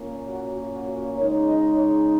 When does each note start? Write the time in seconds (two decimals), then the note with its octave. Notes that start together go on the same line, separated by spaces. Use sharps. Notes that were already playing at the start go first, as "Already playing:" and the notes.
Already playing: A#2 A#3 C#4
0.28 F#4
0.73 F#4
1.17 C#3 G#3 D#4 C#5
1.46 D#5
1.74 C#5